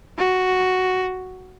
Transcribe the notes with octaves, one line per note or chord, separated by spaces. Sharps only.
F#4